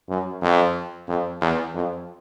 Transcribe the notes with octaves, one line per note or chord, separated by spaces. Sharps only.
F#2
F2
F2
E2
F2